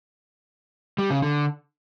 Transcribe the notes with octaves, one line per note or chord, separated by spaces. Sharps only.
G3
C#3
D3